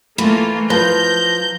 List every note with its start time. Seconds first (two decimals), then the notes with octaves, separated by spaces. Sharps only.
0.18 E3 A3 A#3 F4
0.70 F3 B4 A5 A#5 G6